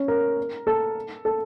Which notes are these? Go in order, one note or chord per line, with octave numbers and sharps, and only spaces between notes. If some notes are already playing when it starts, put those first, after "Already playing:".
Already playing: C#4
A#4
A4
A4